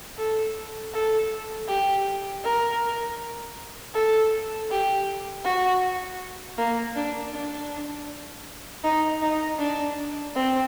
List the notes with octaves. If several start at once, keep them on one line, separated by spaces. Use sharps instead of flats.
A4
A4
G4
A#4
A4
G4
F#4
A#3
D4
D4
D#4
D#4
D4
C4